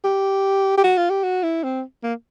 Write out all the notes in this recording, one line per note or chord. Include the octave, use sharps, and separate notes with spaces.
G4
G4
F#4
F4
G4
F#4
E4
C4
A#3